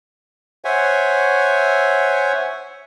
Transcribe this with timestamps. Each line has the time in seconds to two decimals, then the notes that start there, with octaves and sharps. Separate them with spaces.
0.65 C5 C#5 E5 F#5 G#5